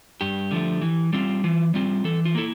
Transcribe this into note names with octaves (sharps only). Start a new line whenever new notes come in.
G2 G4
D3 F3 A3
E3
G3 C4 F4
E3 F4
G3 C4 F4
E3 A4
F4
A#3 E4 A4